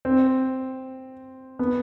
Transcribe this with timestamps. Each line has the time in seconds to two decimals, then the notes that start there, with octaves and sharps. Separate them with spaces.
0.05 C4
1.59 B3